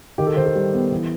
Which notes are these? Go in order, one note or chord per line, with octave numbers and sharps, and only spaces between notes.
D#3 G4
A4
D#3 C5
A4
G3
B3
E3